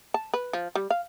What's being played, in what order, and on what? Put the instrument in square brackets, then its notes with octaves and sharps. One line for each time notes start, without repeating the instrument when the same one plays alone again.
[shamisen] A5
B4
F3
G3
F5